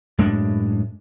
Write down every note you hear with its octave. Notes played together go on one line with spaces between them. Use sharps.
F#2 A2 G#3 D4